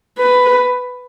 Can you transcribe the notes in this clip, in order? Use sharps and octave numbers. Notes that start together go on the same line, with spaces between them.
B4